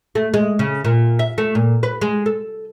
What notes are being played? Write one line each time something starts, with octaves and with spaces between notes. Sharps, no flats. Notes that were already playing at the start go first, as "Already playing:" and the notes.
A3
G#3
C#3
A#2
E5
A3
A#2
B4
G#3
A4